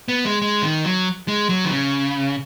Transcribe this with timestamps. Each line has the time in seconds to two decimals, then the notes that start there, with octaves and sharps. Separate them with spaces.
0.08 B3
0.25 G#3
0.41 G#3
0.63 D#3
0.85 F#3
1.28 G#3
1.49 F#3
1.65 D#3
1.71 C#3